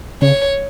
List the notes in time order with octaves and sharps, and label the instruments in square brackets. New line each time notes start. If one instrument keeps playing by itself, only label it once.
[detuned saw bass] C#3 [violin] C#5